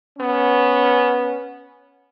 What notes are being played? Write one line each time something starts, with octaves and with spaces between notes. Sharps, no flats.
B3 C#4